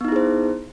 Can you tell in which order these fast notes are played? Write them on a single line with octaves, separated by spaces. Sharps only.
B3 D#4 E4 G#4 C5